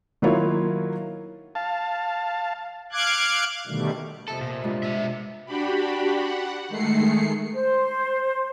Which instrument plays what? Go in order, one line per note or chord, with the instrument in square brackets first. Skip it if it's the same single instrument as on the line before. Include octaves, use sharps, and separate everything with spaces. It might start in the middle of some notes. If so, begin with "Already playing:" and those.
[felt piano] D#3 F#3 A#3 E4 F4 C#5
[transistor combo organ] F5 A5
[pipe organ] F5 D6 F#6 G#6
B2 D3 D#3 G3 A3
[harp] F2 C3 B3 [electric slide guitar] A4
[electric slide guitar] A#2
[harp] G2 G#3 F4
[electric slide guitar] B2 E5 [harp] E6
[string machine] D4 F#4 G4 B5
F#5
D#3 G#3 A3 C7 C#7
[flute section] C5